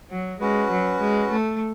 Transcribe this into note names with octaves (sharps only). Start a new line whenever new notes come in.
F#3
G#3 C#4 F#4 B4
F#3
G#3
A3